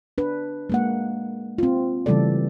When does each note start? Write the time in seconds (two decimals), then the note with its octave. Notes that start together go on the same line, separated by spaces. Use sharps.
0.18 D4 B4
0.70 G#3 A#3 F#5
1.58 C4 F4
2.06 C#3 E3 G3 A3 A4 D5